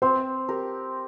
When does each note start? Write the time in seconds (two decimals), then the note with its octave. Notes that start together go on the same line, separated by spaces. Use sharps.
0.02 C4 C5
0.49 G4 A#4